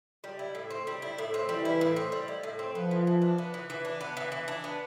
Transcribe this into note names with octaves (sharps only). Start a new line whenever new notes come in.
G3
E4
A2
C4
G3
E4
A2
C4
E3 G3
E4
A2
C4
G3
E4
A2
C4
F3 B3
E3
E3
D4
B3
E3
E3
D4
B3
E3
E3
D4
B3